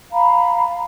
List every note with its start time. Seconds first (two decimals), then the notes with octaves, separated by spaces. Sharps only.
0.12 F5 A#5 B5